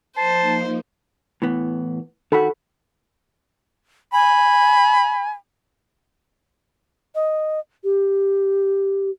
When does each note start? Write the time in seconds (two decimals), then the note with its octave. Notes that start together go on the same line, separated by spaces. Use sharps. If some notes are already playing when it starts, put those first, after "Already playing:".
0.17 F3 A#3 D#4 C5 A5 C7
1.42 A2 E3 B3
2.32 D#3 F#4 A4 B5
4.13 G#5 B5
7.15 D#5
7.84 G4